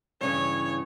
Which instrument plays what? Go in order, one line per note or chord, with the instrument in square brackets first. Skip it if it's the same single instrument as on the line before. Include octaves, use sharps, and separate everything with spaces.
[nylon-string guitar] G2 C#3 E3 [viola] C#5